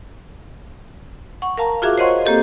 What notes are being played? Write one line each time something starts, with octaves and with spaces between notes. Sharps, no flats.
F#5 C#6
A#4 F5 A5 A#5
F4 F#4 G#4 E5 F5 D6
C5 C#5 D#5 F#5 C6 C#6
A#3 C4 G4 A4 D#5